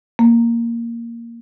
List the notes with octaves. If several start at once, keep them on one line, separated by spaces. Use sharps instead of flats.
A#3